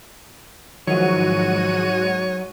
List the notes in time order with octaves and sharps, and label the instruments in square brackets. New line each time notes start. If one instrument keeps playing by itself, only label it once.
[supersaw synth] G#2 F#4 D#7 [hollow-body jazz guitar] D#3 F3 [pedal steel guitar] F#3 [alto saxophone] C#5